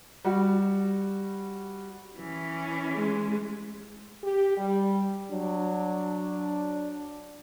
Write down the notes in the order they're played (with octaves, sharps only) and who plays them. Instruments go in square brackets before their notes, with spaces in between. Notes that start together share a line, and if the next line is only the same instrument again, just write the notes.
[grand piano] G3 F#4
[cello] E3 C#4
[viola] G#3
[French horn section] G4
G3
[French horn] F#3 [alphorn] D4